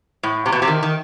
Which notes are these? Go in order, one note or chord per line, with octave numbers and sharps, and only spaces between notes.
A2
C3
B2
C3
D#3
D#3